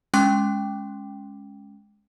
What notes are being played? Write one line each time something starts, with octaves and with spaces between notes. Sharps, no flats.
G#3 C#4 G5 C6 D6 F#6